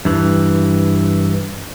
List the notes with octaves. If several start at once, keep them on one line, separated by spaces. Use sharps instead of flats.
G2 E3